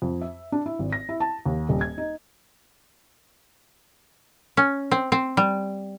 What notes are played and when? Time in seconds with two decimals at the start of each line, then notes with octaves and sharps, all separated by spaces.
0.02 F2
0.21 E5
0.52 D4
0.66 E4
0.79 G#1
0.92 A#6
1.09 E4
1.20 A5
1.45 D#2
1.69 D#1
1.81 G#6
1.98 D#4
4.57 C#4
4.91 C4
5.12 C4
5.37 G3